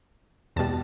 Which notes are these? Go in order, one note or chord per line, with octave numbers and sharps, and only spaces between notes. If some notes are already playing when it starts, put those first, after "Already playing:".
E2 B2 G3 A5